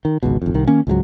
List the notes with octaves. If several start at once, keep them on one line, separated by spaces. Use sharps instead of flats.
D#3
G#1 C#2 B2
G#1 F2
C2 D#3
D#3 A#3 C#4
C#2 G#2 F3 F#3